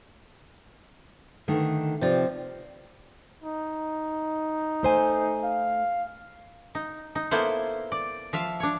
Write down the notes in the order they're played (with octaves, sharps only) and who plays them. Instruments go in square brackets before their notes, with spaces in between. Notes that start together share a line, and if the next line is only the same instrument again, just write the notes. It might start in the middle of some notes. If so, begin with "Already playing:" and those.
[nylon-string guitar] D3 D#3 A3
[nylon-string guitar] C3 F3 [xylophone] C5 D5
[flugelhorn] D#4
[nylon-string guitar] A3 C5 G#5
[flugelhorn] F5
[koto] D#4
D#4
A#3 B3 E4 A4 C5
D5
F3 E5 F5
D4 C#5